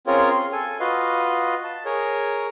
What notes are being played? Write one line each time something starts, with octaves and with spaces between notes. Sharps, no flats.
C4 C#4 F4 G#4 A#4 C#5
C6
A4 G#5
F4 F#4 B4 D#5 F5
A5
G#4 A#4 C#5